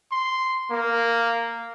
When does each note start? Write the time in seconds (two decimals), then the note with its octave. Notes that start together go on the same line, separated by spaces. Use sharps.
0.12 C6
0.70 A#3